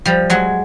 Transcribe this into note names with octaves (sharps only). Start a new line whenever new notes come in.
F3 G3
F#3 G#3